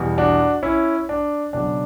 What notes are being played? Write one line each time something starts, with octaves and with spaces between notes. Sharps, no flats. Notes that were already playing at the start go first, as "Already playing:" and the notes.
Already playing: E2 B2 G3
D4 F#4
C#4 E4
D4
C#2 B2 F#3 D4